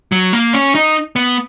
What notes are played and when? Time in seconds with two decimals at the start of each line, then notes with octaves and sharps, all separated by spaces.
0.12 F#3
0.33 A#3
0.53 C#4
0.75 D#4
1.16 B3